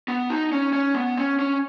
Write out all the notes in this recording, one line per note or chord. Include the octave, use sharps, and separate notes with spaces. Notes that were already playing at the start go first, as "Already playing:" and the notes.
B3
D#4
C#4
C#4
B3
C#4
C#4